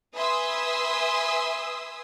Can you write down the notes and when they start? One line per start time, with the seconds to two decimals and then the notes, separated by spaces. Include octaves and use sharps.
0.16 B4 E5 G#5 C6 D#6 E6